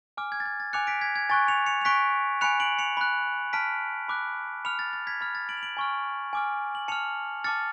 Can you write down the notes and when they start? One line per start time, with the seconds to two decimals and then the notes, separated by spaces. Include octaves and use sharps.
0.17 G#5 D6 F6
0.32 G#6
0.40 A6
0.46 G#6
0.60 A6
0.73 G#5 D6 F#6 C#7 F7
0.87 B6 D7
1.01 G#6 B6
1.16 G#6
1.30 G#5 C#6 F#6 A6
1.48 C#7 F7
1.66 C#7 F7
1.81 F7
1.85 G#5 C#6 F#6 B6 D7
2.41 G#5 B5 F#6 C#7 F7
2.60 D7 F#7
2.79 C#7 F7
2.97 B5 F#6
3.53 A5 F6 B6 D7
4.08 B5 D6 F#6
4.65 B5 F6 C#7 F7
4.79 A6
4.93 A6
5.07 G#6 B6
5.20 B5 F6 A6
5.35 A6
5.49 D7 F#7
5.57 F7
5.63 D7 F#7
5.77 G#5 C#6 F6
6.33 G#5 D6 F6
6.75 F#7
6.88 A5 F6 C#7 F7
7.44 A5 D6 F6 A6 C#7